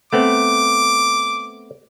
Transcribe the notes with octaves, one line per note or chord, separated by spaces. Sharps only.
A3 B3 C4 D6